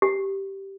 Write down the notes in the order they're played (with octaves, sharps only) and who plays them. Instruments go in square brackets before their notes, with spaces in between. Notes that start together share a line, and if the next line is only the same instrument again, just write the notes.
[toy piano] G4